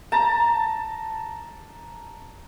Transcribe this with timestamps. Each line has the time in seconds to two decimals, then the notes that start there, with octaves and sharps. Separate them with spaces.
0.12 A5 A#5